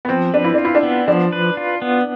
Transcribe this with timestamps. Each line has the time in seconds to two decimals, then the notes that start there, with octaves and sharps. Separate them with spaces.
0.05 B3
0.09 F3 C4
0.34 D4 B4
0.44 E4
0.54 D4 F4
0.65 E4
0.75 D4
0.83 B3
1.08 F3 D4
1.32 B4
1.57 F4
1.82 B3